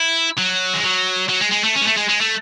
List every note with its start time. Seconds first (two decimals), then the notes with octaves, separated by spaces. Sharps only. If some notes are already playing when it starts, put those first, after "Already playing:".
Already playing: E4
0.38 F#3
0.74 G#3
0.83 F#3
1.29 F#3
1.40 G#3
1.51 G#3
1.64 A3
1.75 C#4
1.81 G#3
1.87 A3
1.97 G#3
2.09 G#3
2.21 A3